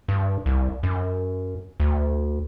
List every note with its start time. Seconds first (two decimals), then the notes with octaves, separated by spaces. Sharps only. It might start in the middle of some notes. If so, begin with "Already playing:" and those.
0.08 G2
0.46 C2
0.83 F#2
1.80 D2